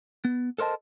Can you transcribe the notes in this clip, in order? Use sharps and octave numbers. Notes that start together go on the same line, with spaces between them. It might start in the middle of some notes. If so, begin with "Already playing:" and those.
B3
A4 A#4 C5 D#5 A5